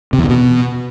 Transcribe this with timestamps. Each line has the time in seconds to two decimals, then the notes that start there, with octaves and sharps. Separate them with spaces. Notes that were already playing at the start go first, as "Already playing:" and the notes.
0.13 C3
0.18 E2
0.24 C3
0.29 B2